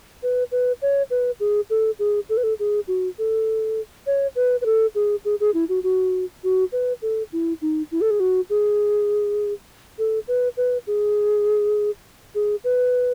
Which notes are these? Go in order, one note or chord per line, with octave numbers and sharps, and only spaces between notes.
B4
B4
C#5
B4
G#4
A4
G#4
A4
B4
A4
G#4
F#4
A4
C#5
B4
B4
A4
G#4
G#4
G#4
E4
F#4
F#4
F#4
B4
A4
E4
D#4
E4
A4
G#4
F#4
G#4
A4
B4
B4
G#4
G#4
B4